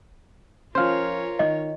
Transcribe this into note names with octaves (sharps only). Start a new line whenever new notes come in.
F3 C#4 F4 A#4 C5 C#5 F5
D#3 D#5